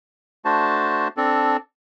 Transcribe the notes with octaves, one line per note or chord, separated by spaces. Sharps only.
A3 D4 F#4 C5 A5
C4 D4 A4